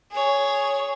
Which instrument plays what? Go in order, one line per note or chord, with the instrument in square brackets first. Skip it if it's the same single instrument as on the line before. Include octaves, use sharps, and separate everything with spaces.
[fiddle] G#4 C#5